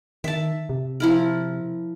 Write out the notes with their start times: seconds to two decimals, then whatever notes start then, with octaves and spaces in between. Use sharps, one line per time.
0.24 D#3 E5 A5
0.69 C3
1.00 F3 E4 A#4